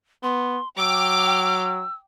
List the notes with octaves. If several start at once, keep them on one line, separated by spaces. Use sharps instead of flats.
B3 C6
F#3 G5 D6 E6 F6